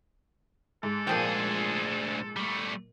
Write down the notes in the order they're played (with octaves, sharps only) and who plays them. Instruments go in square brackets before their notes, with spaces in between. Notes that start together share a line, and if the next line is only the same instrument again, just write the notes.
[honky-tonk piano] G#2 [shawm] A4
[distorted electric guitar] D2 G#4 [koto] A#2 F3 G5
[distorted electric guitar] G3 A3